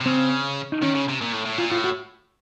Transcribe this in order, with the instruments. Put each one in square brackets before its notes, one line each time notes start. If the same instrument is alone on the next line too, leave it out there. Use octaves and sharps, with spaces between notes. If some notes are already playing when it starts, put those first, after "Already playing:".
[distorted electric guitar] C3
[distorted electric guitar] C#3 [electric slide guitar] C4
[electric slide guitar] D#4
[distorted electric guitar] D#3 [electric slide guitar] C#4
[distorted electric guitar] C#3
C3
A#2
A2
A2
[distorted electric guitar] A#2 [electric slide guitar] F4
[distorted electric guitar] A2 [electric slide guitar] F4
[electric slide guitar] F#4